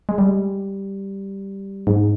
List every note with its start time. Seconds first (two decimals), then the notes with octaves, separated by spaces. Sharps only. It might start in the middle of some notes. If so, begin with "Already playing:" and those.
0.09 G#3
0.18 G3
1.87 G#2